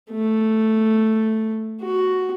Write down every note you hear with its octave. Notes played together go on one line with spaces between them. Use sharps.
A3
F#4